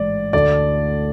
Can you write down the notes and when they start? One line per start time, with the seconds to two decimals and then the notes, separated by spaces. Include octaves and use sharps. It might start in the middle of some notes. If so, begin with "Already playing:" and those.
Already playing: A1 G#2 G#3 D5
0.33 D2 D3 A3 D5